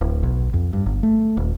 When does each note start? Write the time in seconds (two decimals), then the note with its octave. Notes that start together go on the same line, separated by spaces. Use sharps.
0.01 D1
0.23 B1
0.54 F2
0.73 G2
0.86 G1
1.03 A3
1.37 D#1